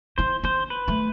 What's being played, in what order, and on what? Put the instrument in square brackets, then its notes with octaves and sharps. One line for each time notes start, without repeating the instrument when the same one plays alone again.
[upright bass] E4 [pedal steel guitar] C5
[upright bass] D4 [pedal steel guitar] C5
[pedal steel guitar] B4
[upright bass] A3